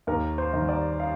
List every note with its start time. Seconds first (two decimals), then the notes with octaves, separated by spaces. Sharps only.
0.07 D#2 A#4
0.38 C5
0.53 D#3 G3
0.69 D5
1.00 F5